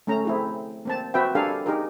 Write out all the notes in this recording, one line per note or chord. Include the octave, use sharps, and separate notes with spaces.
A3 C#4 A#5
C4 E4 G#4
A#3 C4 A5
C4 F#4 B4 E5 G5
D4 G4 A4 A#4 F5 G#5
D#4 G4 G#4 A#4